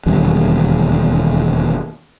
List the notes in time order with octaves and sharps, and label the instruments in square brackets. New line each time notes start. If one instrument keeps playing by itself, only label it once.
[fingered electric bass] E1 D#2 D3 G3